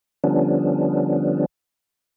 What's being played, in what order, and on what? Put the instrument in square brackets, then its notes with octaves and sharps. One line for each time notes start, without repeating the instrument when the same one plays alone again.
[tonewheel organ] D3 F3 G3 B3 C#4 D4